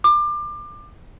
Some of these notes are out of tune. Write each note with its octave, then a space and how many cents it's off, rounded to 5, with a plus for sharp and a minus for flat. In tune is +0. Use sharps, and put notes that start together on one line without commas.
D6 +25